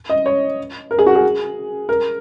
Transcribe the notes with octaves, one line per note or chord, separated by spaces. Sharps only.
D#5
C#5
A#4
G#4
F#4
G#4
A#4